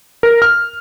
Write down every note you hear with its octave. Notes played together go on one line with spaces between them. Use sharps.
A#4
F6